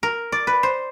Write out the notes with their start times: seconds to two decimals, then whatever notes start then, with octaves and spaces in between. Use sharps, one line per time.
0.03 A#4
0.32 D5
0.47 B4
0.63 C5